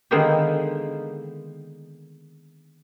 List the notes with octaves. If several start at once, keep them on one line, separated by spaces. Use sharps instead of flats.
D3 D#3 G#3 A#3 B3 G4